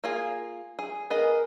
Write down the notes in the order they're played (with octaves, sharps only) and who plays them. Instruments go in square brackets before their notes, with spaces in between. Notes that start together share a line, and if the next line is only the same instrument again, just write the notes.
[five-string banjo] A#3 F4 G#4
G#4
[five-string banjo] B3 G#4 D#5 [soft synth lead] A#4